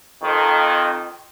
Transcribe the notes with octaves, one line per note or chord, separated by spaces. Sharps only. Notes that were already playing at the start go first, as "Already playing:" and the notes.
F2 D#3